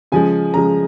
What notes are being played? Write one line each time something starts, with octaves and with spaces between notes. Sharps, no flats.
C#3 F3 G#3 G#5
C#3 F3 G#3 A#5